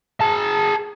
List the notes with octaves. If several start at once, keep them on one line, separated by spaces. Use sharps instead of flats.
G#4 A5